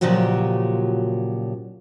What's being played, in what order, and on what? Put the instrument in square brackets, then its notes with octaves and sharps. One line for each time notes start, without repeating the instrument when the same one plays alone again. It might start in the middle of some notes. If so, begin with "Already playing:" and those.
[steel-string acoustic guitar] A#2 C#3 F3 F#3 F#4 G4